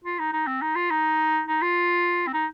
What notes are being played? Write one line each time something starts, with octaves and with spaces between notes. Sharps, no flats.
F4
D#4
D#4
C4
D#4
F4
D#4
D#4
F4
C4
D#4